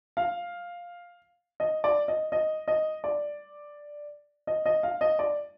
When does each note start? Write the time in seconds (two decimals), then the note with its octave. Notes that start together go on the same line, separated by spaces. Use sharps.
0.17 F5
1.60 D#5
1.84 D5
2.08 D#5
2.32 D#5
2.68 D#5
3.04 D5
4.47 D#5
4.66 D#5
4.83 F5
5.01 D#5
5.19 D5